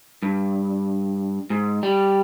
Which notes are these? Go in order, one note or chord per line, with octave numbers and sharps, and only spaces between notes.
G2
G#2
G3